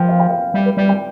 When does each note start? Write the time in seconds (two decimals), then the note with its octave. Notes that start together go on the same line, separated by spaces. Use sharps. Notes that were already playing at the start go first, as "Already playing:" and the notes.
Already playing: F3 G5
0.09 F5
0.20 G5
0.30 F5
0.54 G3 E5
0.66 B4
0.77 G3 D5
0.89 G5